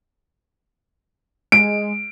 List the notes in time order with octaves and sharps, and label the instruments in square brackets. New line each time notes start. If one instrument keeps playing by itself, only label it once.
[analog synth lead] G#3 [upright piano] D7